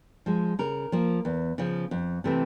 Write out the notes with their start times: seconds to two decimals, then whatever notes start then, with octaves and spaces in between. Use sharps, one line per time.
0.26 F3 G#3
0.59 C#3 A#4
0.92 F3 A#3
1.25 E2
1.58 C#3 F3
1.91 F2
2.24 C3 E3 A3 C4